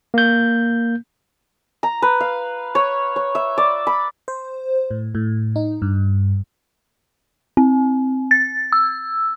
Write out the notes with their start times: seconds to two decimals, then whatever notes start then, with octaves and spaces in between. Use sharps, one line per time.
0.14 A#3 G6
1.83 A#5
2.02 B4
2.20 F5
2.75 C#5
3.16 C#5
3.35 E5
3.58 D5
3.87 B5
4.28 C5
4.91 A2
5.15 A2
5.56 D#4
5.82 G2
7.57 C4
8.31 A6
8.72 E6